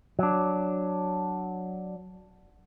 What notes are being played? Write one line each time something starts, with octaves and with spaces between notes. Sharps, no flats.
F#3 D4